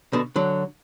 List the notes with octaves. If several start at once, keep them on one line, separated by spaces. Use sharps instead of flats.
B2 D3
D3 F#3